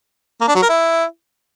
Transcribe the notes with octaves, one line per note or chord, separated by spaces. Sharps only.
A#3
D4
F#3
A#4
E4